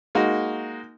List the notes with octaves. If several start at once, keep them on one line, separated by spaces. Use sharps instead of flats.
G#3 A#3 D#4 F#4